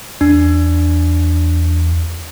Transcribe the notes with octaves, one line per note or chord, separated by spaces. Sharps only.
E2 D4